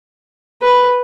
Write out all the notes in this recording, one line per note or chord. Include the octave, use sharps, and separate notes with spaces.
B4